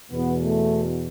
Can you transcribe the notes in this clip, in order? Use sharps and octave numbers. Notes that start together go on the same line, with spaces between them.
E2 B2 B3
A3